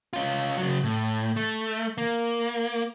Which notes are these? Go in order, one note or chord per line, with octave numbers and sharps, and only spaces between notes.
C#4 F4
C#3 F#3
A2
A3
A#3